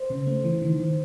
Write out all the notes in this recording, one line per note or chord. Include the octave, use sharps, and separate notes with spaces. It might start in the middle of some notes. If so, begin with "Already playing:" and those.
Already playing: C5
C#3
A3
E3
D#3
D#3